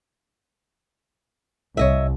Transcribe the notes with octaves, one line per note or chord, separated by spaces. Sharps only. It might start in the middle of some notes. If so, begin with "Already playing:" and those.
C2 C#5 D#5 E5